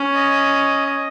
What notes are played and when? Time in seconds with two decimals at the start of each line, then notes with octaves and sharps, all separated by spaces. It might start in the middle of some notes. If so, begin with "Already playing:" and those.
Already playing: C#4
0.15 D#5
0.86 D#5